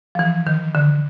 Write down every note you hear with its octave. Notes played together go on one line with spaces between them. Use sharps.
F3
E3
D#3
D3